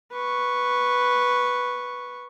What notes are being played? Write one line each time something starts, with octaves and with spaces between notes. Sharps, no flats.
B4 C#6